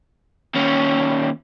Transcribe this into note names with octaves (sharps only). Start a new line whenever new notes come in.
D#2 C#4